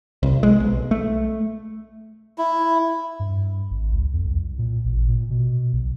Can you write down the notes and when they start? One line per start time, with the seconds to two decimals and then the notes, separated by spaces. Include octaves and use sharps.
0.23 C2
0.43 G#3
0.60 B1
0.91 A3
2.38 E4
3.19 G2
3.71 G#1
3.92 C#2
4.13 F2
4.26 C2
4.58 A#2
4.85 A1
5.08 A#2
5.30 B2
5.73 B1